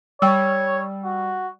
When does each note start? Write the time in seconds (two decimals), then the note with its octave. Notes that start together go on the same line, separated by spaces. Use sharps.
0.22 G3 C#5 G5 E6
1.04 F#4